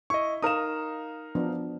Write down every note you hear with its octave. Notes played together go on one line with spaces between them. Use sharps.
E4 D#5 C#6
D#4 A#4 F5 D#6 E7
F3 B3 D4